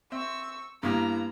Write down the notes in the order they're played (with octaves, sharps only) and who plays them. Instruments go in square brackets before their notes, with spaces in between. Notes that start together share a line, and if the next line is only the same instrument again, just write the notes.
[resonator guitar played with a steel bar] C4 E5 [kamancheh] C#6 E6
[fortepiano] G2 [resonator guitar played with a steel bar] A#3 B3 [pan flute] E4 [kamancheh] A#5